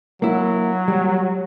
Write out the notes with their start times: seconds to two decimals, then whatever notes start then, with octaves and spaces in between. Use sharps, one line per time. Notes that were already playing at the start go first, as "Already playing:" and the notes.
0.22 F#3 A#3 E4
0.88 G3